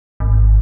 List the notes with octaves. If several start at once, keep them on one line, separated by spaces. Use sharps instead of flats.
G#1